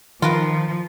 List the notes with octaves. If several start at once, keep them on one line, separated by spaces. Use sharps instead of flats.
D#3 F3 F4 A#4 B4